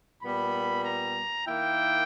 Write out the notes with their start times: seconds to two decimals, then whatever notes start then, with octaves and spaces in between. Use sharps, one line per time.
0.22 A#2 G3 B3 B5
0.85 A#5
1.47 D#3 A#3 E4 G5